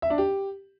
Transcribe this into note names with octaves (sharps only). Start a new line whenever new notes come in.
E5
D4
G4